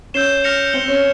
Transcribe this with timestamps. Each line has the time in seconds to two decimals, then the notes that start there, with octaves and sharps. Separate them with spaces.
0.14 C#4 E6 G6 C7 E7 G7
0.44 F6 A#6 C#7 F7
0.73 C4 G6 C#7 G7
0.88 C#4